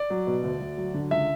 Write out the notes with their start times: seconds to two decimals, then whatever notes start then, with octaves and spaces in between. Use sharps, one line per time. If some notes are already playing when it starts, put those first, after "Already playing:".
Already playing: D5
0.10 F#3
0.27 B2
0.43 D2
0.61 D2
0.77 F#3
0.94 D3
1.10 C#2 E5